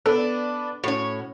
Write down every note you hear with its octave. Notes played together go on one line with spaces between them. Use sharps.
B3 D4 A4 B4 D5
A2 C#4 F#4 C#5 C#7